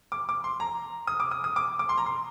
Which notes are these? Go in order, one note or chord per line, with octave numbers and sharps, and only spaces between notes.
D6
D6
C6
A#5
D#6
D6
D#6
D#6
D6
D6
C6
A#5
C6